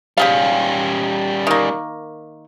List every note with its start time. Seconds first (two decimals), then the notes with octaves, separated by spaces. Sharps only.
0.17 G3 C#4 G4 G#4 F5
1.47 D#3 A#3